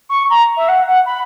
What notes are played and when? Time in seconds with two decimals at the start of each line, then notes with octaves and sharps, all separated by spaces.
0.10 C#6
0.30 A#5
0.57 E5
0.68 F#5
0.87 F#5
1.06 B5